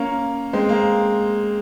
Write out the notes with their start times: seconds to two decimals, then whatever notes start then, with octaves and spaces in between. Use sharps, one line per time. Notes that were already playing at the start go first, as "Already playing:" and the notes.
Already playing: A#3 C#4
0.53 G#3 C4
0.69 A#3